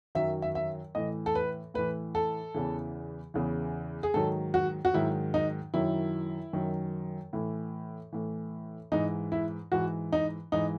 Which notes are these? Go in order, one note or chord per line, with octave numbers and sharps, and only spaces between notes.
F#2 D#3 F#3 E5
E5
E5
A2 E3 D#5
A4
B4
A2 E3 B4
A4
E2 C#3 E3
E2 C#3 E3
G#4
G#2 D#3 F#3 A4
F#4
F#4
G#2 D#3 F#3 E4
D#4
F#2 D#3 F#3 E4
F#2 D#3 F#3
A2 E3
A2 E3
G#2 E3 D#4
E4
G#2 E3 F#4
D#4
G#2 E3 D#4